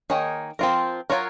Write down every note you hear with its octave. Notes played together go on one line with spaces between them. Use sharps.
D#3 A#3 D#4 G#4 C#5
F3 C4 F4 A#4
F#3 A#3 F4 A#4 C#5